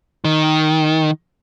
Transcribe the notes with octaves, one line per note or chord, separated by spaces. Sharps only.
D#3